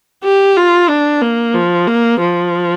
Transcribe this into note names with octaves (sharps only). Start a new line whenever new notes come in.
G4
F4
D4
A#3
F3
A#3
F3